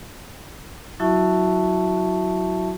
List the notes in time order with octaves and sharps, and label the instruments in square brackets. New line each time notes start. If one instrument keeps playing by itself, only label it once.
[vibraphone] F#3 E4 F#4 E5 A5 C#6